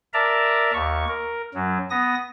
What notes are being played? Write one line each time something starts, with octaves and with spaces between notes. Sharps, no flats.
A#4 D5 E5 A5 A#5
D#2 C#6
A#4
F#2 F#3
B3 D#6 A#6